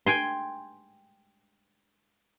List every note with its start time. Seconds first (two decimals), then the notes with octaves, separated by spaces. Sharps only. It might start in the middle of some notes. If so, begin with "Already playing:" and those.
0.06 G5 G#5 C6